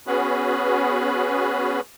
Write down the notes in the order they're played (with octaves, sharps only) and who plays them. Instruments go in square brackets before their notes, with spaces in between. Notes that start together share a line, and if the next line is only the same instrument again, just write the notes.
[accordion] B3 C#4 F#4 G#4 B4